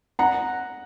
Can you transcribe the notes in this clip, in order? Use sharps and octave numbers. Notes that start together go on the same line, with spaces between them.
F#5 A#5